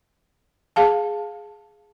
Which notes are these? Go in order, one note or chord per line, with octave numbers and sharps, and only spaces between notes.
G#4 F5 A5